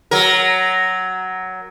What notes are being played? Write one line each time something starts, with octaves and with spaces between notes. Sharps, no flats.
F#3 A#4